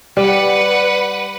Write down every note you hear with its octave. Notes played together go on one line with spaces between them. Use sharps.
G3 B4 F#5